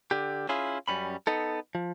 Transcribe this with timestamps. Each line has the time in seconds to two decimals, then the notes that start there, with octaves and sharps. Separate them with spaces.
0.11 D3 G4
0.49 C#4 E4 F4 G#4
0.88 F#2 G3 C#4 B5
1.27 B3 D#4 A4
1.75 F3